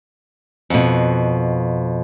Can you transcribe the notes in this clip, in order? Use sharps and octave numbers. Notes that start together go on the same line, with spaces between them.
F2 B2